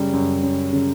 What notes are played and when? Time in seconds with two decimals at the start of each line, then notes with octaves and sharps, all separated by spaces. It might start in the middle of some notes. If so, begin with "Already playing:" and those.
Already playing: F#2 C#3 G3
0.13 F#2
0.43 F#2
0.73 C#3